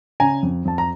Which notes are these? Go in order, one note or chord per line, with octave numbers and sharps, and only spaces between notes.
C#3 G#5 A#5
F2
F2 A5
A#5